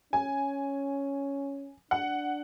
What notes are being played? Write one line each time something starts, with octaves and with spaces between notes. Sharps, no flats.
C#4 G#5
D4 F#5